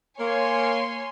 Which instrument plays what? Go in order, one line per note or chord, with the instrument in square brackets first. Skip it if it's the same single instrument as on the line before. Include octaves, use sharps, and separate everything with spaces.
[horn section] A#3 [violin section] C#5 G#5 C6